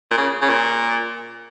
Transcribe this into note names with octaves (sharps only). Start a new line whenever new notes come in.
A#2
C#3
C#3
A#2